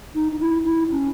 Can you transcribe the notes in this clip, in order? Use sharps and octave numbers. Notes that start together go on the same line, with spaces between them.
D#4
D#4
E4
E4
C#4